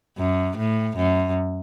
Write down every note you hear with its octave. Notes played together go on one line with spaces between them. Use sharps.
F#2
A2
F#2